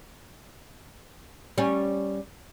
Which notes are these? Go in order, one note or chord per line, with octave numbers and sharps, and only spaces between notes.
G3 C#4